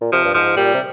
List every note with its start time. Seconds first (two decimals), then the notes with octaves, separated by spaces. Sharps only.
0.01 A#2
0.12 C3 F3
0.25 G2
0.34 G#2 F3
0.56 A#2 G3
0.74 C3